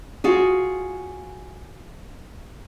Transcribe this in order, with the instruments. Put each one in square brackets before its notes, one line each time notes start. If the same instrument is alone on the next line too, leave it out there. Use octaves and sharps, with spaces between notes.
[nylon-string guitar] F4 F#4 G#4